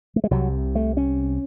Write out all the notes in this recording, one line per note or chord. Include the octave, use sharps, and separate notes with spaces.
A3
G#3
C2 C3 F#3
A3
C#4